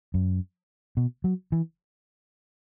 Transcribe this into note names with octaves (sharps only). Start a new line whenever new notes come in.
F#2
B2
F#3
E3